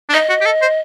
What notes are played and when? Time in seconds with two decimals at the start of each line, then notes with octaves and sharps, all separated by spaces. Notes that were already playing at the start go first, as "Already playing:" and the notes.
0.09 D4
0.13 D#4 D#5
0.29 F#4
0.41 G4
0.45 A4
0.62 C5